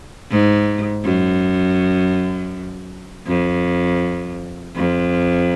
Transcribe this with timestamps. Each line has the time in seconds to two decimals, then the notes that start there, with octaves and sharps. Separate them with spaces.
0.30 G#2
1.04 F#2
3.27 F2
4.76 F2